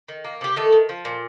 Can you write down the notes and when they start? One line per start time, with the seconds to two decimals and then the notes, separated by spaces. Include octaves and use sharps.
0.08 D#3
0.24 A#3
0.41 C3 G4
0.56 D#3 A3 A4
0.73 D#3
0.89 F3
1.05 A#2